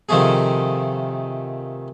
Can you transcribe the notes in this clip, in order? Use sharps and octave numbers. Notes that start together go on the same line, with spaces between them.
C3 D#3 F3 A3 G#4